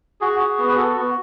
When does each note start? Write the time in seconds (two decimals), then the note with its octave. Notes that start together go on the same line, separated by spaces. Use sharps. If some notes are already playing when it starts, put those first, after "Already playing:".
0.21 F#4 G#4
0.40 F#4
0.59 B3
0.69 B4
0.77 F#4 A4
0.97 B3 F#4